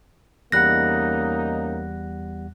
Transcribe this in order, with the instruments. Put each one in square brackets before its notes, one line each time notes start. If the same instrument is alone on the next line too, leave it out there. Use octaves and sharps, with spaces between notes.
[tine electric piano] E2 G3 F#5 [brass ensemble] A#3 C#4 D#4 [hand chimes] F#6 A#6